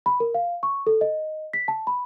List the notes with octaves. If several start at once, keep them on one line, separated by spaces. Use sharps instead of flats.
B5
A#4
F5
C#6
A4
D#5
B6
A5
B5